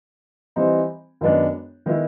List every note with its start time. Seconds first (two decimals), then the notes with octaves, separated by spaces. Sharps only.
0.56 E3 G3 C4 D#4
1.21 F#2 D#3 G#3 B3 D4
1.86 D#3 G#3 B3 E4